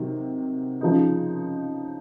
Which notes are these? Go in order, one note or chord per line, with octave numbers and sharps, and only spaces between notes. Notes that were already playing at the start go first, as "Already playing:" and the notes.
Already playing: C3 D#3 F#3
C#3 F3 G#3 D#4